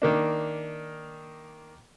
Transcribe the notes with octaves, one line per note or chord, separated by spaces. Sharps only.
D#3 A#3 D4